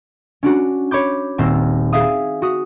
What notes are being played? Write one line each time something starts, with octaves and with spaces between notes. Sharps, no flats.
C#4 D4 F#4
C#5 B5 D6 G6
D#1 C4 E6 F6 A#6
G#4 E5 F5 D#6
F#4 D#6